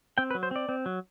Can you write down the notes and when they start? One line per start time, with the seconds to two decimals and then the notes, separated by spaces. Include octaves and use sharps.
0.18 C4 G5
0.31 B4
0.35 F#3
0.43 C5
0.51 C4 D5
0.69 C4
0.86 F#3